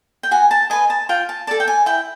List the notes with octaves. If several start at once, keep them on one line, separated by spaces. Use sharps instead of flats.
G5
F#4 G#5
A5
B4 D#5 G#5
A5
F4 G5
A5
A4 D5 A5
G5
G#5
E4 G5